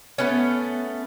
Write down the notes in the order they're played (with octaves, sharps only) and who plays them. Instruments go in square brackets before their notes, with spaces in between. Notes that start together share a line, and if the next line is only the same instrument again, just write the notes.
[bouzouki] A3 B3 C#4